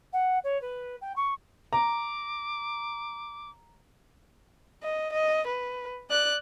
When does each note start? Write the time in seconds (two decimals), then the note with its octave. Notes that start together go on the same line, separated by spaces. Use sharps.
0.13 F#5
0.44 C#5
0.62 B4
1.02 G5
1.16 C#6
1.73 A#5 D6
4.83 D#5
5.13 D#5
5.47 B4
6.10 D5 F#6